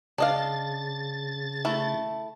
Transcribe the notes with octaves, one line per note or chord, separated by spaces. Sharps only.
C#3 D4 D#5 F5 A6
A3 E4